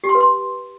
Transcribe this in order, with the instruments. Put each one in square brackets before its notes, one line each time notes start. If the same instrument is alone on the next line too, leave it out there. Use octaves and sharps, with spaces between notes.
[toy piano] G4
C6
B4
C6